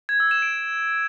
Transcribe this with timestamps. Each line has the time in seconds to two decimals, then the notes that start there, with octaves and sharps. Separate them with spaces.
0.09 G#6
0.20 E6
0.31 E7
0.42 D7